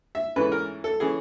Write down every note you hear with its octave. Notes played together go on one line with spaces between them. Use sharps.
E5
G#2 E3 A3 C#4 B4
A#4
A4
E3 A3 C#4 G#4